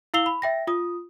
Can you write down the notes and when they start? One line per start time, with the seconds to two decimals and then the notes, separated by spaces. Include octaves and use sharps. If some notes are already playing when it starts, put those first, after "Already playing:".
0.14 E4 F5 E6 C7 F7 G7
0.26 B5
0.42 E5 G5 A#6
0.67 F4 D#6